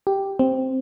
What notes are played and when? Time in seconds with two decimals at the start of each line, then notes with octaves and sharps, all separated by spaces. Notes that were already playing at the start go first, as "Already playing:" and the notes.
0.07 G4
0.39 C4